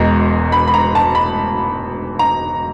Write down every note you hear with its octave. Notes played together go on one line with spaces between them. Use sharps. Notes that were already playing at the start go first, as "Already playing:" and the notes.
Already playing: E1 E2 B2 G#3 A#5
B5
B5
A#5
A5
B5
A#5